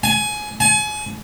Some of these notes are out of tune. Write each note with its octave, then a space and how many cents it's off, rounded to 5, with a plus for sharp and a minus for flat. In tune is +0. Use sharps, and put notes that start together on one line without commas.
G#5 +20
G#5 +35